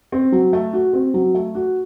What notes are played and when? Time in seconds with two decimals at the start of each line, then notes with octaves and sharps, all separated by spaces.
0.12 C4
0.32 F#3
0.53 A3
0.73 F#4
0.93 C4
1.14 F#3
1.35 A3
1.55 F#4